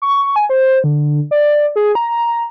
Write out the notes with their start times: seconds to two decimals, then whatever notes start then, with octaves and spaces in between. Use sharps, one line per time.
0.02 C#6
0.36 G#5
0.49 C5
0.84 D3
1.31 D5
1.76 G#4
1.95 A#5